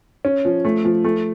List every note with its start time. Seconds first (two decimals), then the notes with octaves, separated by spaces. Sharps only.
0.25 C#4
0.45 F3
0.65 A3
0.85 F3
1.04 A3